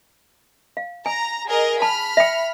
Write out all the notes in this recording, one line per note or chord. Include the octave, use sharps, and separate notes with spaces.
F5
G#5 A#5
G#4 A#4 D#5
A5 B5 F6
E5 G5